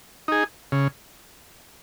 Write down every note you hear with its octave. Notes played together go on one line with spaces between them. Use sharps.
D#4 G#4
C#3